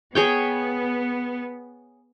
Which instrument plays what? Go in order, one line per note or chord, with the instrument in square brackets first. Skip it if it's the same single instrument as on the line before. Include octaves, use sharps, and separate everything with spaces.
[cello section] B3 [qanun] G#4 C#5 G5